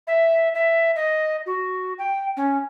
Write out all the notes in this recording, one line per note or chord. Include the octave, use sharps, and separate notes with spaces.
E5
E5
D#5
F#4
G5
C#4